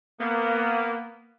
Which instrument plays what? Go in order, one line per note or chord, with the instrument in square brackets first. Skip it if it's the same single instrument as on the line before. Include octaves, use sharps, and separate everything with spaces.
[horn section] A#3 B3